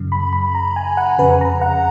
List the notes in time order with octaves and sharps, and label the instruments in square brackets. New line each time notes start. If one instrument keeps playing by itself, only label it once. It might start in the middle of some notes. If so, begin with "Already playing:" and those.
Already playing: [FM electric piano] F#2 C#3
B5
B5
A#5
G#5
F#5
F2 C#3 B4
A#5
F#5